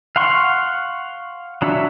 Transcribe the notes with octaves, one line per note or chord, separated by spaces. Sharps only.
F5 F#5 C6 C#6
F#3 D4 F#4 E5